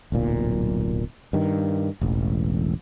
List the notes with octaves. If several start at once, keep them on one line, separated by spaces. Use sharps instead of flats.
D1 B1 A#2
G2 D#3
E1 A1